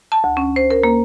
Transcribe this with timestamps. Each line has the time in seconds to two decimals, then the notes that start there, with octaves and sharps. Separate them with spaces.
0.12 A5
0.24 D2
0.37 C#4
0.56 C5
0.71 A#4
0.84 A#3